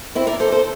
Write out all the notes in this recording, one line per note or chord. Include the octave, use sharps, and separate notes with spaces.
C4 E4
A#4 D5
A4 C5
A4 C5